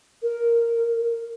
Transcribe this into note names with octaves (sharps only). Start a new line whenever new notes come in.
A#4